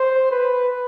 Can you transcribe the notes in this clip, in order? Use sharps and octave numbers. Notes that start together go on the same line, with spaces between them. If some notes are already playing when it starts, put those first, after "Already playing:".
Already playing: C5
B4